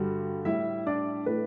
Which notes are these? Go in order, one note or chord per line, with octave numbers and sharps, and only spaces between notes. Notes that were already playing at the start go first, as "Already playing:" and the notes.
Already playing: G2 D3 G3 F#4
A2 G3 E4 E5
D4 D5
A2 E3 A3 B4